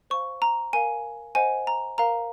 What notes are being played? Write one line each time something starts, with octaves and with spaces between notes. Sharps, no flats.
C5 F5 C#6
A#5
A#4 F5 G#5
C5 D#5 F#5 G#5
A#5
A#4 F5 A#5